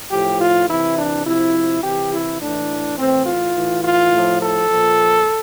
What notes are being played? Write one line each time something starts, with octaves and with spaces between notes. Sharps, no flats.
A2 F3 G4
F4
C3 E3 E4
D4
C3 F3 E4
C3 E3 G4
E4
A2 E3 D4
A2 E3 C4
F4
A2 E3
F4
A2
F3
A4
A#2 F3